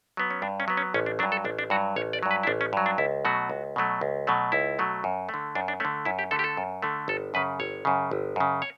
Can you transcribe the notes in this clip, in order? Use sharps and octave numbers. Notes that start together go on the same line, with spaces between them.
F#3 B3
C#4
G2 D4
C#4
F#3 B3
C#4
A1 C#4
D4
G2 F#3 D4
A4
A1 D4
D4
G2 F#3 F#4
A1 C#5
D5
G2 F#3
B4
E4
A1 D4
C#4
G2 F#3
D4
C#2 E4
B2 F#3 A3 F#4
C#2
B2 F#3 A3
C#2
B2 F#3 A3
C#2 E4
B2 F#3 A3
F#2
A3
D3
F#2 D4
D4
D3 A3 C#4
F#2 E4
G4
D3 A3 A4
G4
A4
F#2
D3 A3
G1 A4
F#2 C#3 B4
G1 C#5
F#2 C#3
G1
F#2 C#3
C#5